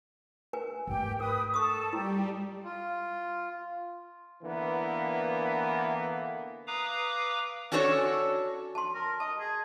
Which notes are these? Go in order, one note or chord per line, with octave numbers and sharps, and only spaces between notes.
A#4 B4 G#5
G#2 A3 G4 G5
A#4 B4 D#6
A4 C#6 D#6
G3 E4 G4
F4
D3 E3 A#3 B3
B4 F5 A#5 D6 D#6
C#4 D4 F#4 A4 A#4 C#5
A5 C6
A#4
D#5 A5
G#4